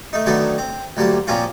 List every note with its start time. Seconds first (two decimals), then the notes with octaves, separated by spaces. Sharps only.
0.13 A3 D#4
0.26 D3 D#3 F#3 A3 B3 D4
0.58 C4
0.97 D2 F#3 G3 A#3 A5
1.27 A#2 F3 A#3 C4 C#4 F4